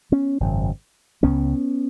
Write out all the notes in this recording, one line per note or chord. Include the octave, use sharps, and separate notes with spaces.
B3 C#4
G#1 F#2 C#3
C#2 C#3 B3 C#4